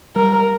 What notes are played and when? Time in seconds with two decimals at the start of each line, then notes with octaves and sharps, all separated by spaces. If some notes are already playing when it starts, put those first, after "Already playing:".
0.16 G3 A#4